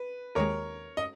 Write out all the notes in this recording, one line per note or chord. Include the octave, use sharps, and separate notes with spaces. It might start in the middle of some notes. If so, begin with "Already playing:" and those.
Already playing: B4
D#2 D#3 G#3 A#4 C#5
D#5